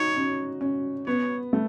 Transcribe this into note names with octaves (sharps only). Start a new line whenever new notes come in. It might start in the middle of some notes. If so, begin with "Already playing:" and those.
Already playing: D#4 F#4 C#5
C#4
C#4
B3 C#5
A3